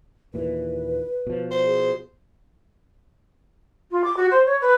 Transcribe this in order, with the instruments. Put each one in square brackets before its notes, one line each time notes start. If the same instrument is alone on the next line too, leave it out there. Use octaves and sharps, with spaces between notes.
[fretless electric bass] D#2 A#2 E3 [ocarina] B4
[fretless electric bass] B2 F3
[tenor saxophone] C5
[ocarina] G#4
[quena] F4
D6
F#4
C5
C#5
B4